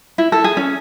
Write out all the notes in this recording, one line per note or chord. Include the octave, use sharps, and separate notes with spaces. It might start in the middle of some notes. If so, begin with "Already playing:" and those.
E4
A4
G#4
C#4